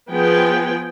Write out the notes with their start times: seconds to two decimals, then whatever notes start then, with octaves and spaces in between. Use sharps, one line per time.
0.10 F3 B3 G#4 G5